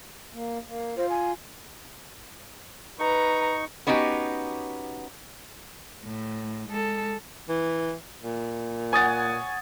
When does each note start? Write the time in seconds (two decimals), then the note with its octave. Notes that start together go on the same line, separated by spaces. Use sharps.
0.33 A#3
0.68 A#3
0.97 F4 C5
1.10 G#5
2.99 D#4 B4 A#5 C#6
3.87 B3 C#4 D#4 F#4 G4
6.05 A2
6.69 G#3 A4
7.49 E3
8.23 A#2
8.93 C#5 F#5 G#5 D#6 A6